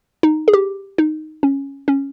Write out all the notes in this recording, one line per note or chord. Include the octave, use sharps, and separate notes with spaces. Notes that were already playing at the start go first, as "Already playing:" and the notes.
D#4
G#4
G4
D#4
C#4
C#4